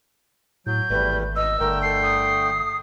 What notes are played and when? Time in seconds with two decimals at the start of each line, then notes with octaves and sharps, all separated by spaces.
0.67 A2 F#3 G6
0.90 G#1 E2 G3 A3 B4
1.36 B2 D#5 E6
1.60 G1 D3 A3 A#4 G5
1.83 A4 C7
2.02 D#6